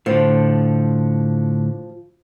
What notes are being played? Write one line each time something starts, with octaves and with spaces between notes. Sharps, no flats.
A2 D3 F3